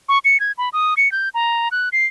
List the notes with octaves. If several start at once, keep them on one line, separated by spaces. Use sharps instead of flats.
C#6
C#7
G#6
B5
D#6
C#7
G6
A#5
F#6
C7